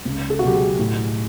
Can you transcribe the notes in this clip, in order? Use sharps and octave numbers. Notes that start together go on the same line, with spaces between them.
C#2
A4
F#4
B2 F#3 G4
G#4
A2